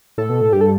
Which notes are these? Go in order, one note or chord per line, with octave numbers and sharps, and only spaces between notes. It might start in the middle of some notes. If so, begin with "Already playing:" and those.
A2 A4
B2
A2
G2 G4
A4